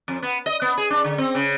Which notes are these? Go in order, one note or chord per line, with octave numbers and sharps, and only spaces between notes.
F2
B3
D#5
B3
G#4
D4
D3
C4
C#3